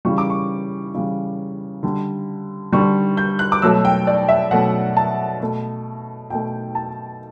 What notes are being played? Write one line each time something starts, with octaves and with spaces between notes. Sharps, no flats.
C#3 E3 G3 C#6
D6
C#6
C#3 E3 G3
D3 G3
D3 G3 C#6
G6
F#6
D6
B2 F#3 A3 E6
G5
D5
E5
B2 F#3 A3 F#5
A5
B2 A3
B2 A3 G5
A5